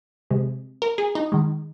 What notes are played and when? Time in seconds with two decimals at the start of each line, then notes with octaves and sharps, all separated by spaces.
0.31 C3 G#3
0.82 A#4
0.98 G#4
1.15 D#4
1.32 D#3 G#3